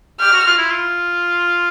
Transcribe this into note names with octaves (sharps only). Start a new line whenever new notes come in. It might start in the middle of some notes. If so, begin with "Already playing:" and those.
G4 F6
F#4
F4
E4
F4